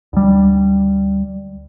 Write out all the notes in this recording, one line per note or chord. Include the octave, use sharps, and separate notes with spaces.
D2 G3